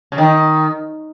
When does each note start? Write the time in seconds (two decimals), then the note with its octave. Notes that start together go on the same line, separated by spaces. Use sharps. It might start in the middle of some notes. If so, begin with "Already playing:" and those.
0.12 C#3
0.18 D#3